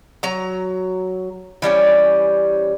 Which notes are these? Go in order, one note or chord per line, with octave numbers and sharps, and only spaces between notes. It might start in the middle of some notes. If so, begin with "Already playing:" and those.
F#3 A#5
E3 G3 A3 C#4